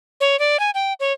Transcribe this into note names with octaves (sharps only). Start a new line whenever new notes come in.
C#5
D5
G#5
G5
C#5